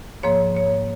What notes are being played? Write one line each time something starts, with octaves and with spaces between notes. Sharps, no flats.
G#2 F3 A#3 C#5
C#5